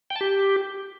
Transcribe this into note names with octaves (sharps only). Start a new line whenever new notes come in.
G5
A5
G4